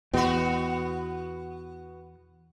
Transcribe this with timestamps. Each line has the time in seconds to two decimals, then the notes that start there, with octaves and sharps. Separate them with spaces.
0.13 E2 B2 B3 F#4